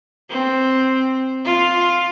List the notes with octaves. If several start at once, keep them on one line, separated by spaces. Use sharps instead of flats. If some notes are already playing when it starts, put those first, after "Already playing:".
C4
F4